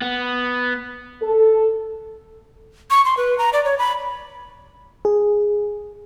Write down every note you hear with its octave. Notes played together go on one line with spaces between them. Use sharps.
B3
A4
C#6
C6
B4
A#5
D5
C#5
B5
G#4